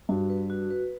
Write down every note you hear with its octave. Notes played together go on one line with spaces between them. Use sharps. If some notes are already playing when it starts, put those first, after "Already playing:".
G2 F#4
B4
F#4
B4